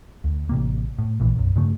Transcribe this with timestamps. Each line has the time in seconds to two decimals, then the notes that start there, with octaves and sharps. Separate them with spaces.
0.24 D2
0.49 A1 C3 A#3
0.99 A2
1.20 A#1 A#2 E3
1.36 B1 F#2
1.56 G2 C#3 A3